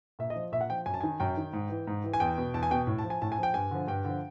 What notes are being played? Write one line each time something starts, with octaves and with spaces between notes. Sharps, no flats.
A#2 E5
D#5
F3
A#2 E5
F#5
F3 G5
F#2 G#5
A5
D#3 G#5
F#2 G5
D#3
G#2
E3
G#2
E3
G#5
E2 G5
B2
E2 A5
G#5
B2 G5
A2
A5
F3
G#5
A2 A5
G#5
F3 G5
G2 G#5
D3 F3
G2 G5
D3 F3